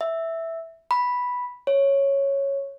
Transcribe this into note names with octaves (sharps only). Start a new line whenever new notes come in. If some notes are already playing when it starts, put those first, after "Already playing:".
E5
B5
C#5